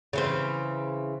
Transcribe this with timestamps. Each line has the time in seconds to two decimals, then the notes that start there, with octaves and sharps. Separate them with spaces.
0.13 C#3 E3 C4